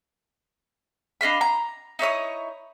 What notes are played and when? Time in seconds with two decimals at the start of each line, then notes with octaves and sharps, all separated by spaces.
1.21 D4 D#5 F5 B5
1.41 A#5
1.99 D#4 E4 C#5 D#6